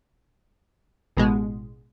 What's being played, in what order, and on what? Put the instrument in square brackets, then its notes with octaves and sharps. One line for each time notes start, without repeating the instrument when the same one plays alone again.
[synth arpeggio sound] A1 B2 G#3